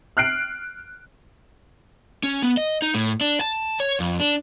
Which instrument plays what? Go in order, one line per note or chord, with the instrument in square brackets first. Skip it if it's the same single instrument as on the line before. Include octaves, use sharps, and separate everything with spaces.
[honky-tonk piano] F6 F#6 C7 D7
[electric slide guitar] C#4
B3
D#5
D#4
A2
D4
A5
C#5
F2
D4